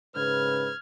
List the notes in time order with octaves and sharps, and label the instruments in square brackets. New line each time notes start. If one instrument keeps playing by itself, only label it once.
[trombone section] G#2 C#3 B4 [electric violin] F6 G#6